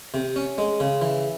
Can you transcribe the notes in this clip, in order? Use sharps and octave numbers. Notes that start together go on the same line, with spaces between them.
C3
C#4
G#3
C#3
E3